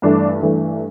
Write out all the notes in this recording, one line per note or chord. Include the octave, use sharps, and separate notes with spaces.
G2 E3 A3 D4
G2 E3 A3